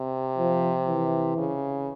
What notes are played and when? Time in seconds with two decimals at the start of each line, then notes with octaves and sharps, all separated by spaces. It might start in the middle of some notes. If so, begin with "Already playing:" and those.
Already playing: C3
0.38 F3
0.88 E3
1.38 C#3